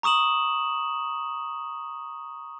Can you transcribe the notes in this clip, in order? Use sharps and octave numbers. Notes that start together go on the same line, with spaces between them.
A#5 C#6 D#6 E7 F#7